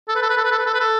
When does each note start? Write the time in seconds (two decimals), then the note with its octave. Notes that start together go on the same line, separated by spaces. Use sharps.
0.08 A4
0.16 B4
0.22 A4
0.30 B4
0.37 A4
0.44 B4
0.52 A4
0.58 B4
0.66 A4
0.74 B4
0.80 A4